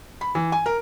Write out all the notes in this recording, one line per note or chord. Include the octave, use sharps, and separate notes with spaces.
B5
E3
G#5
A#4